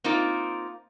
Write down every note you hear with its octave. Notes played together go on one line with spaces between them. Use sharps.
A#3 C4 D#4 F4 A#4